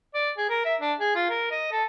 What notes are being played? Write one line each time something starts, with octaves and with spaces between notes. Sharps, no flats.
D5
G#4
A#4
E5
D4
G#4
F4
A#4
D#5
A4